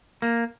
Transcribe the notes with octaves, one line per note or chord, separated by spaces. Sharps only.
A#3